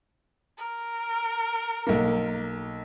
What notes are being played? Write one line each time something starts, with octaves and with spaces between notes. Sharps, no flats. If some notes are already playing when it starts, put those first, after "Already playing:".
A#4
B1 A#3